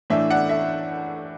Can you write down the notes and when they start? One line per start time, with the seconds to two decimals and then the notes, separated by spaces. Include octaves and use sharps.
0.10 A2 E3 A3 D4 E5
0.30 D5 F#5
0.49 E5